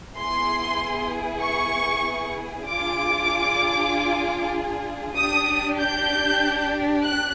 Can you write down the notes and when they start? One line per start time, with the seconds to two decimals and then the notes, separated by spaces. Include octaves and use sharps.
0.15 B3 E4 G#4 C6
1.41 C#6
2.65 D4 F4 G#4 D6
5.16 D4 G4 D#6
5.79 G6
7.04 F#6